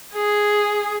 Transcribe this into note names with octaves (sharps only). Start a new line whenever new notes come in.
G#4